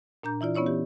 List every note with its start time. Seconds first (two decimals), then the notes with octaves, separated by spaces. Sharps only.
0.23 A#2 D4 A#5 G6
0.41 E3 E4 F4 D5
0.55 B3 C#4 E4 C#5 D5
0.66 E3 G4